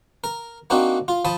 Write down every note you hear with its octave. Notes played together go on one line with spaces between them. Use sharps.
A#4
A#3 C4 D4 D#4 F#4
F4
F3 A5 B5 D#6